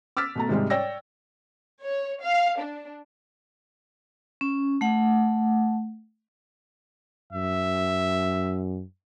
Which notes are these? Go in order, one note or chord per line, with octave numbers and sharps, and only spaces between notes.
D6 E6 F6 A6 B6
B2 A3 A#5
G#2 C3 G3 G#3
C#5 D5 G5 E6 A#6
C#5
F5
D4
C#4
A3 F#5
F#2 E5